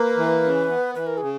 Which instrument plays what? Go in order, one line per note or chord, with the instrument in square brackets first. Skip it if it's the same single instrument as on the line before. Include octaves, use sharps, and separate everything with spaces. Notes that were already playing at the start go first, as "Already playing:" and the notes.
Already playing: [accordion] A#3 [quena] B4
[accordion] E3
C#3
B3
[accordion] E3 [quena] B4
[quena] A#4
[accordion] C#3 [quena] G#4